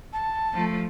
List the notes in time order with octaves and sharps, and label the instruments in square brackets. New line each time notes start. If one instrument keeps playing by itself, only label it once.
[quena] A5
[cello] F3 A3